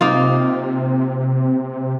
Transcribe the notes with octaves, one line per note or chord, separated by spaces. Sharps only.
C3 A#3 D#4 F4